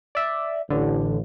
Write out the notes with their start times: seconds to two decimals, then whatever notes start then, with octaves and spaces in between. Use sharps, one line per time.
0.15 D5 E5
0.70 A1 D3